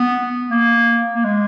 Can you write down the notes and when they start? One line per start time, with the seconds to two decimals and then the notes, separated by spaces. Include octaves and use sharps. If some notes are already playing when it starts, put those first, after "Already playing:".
Already playing: B3
0.50 A#3
1.15 A#3
1.24 G#3